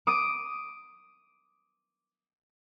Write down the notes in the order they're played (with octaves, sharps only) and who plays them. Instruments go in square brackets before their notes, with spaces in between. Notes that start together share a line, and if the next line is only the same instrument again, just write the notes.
[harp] D6 D#6 D7